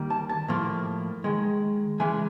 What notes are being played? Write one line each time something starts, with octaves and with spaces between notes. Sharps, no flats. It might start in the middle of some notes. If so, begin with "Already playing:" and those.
Already playing: D#3 G3 A#3
A5
A5
A2 F3 A#3
D#3 G#3
C#3 E3 G#3 G#5